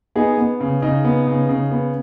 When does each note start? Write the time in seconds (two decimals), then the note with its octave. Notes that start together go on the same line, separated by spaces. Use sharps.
0.16 B3 D#4 G#4
0.38 B3
0.60 C#3
0.82 C#3 D#4
1.04 B3
1.27 C#3
1.49 C#3
1.71 B3